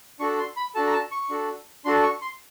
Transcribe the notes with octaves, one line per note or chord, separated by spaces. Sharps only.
D4 F#4 A4 C#6
C6
B5
D4 F#4 A4 A5
A#5
A5
C#6
D4 F#4 A4
D4 F#4 A4 C6
C#6
C6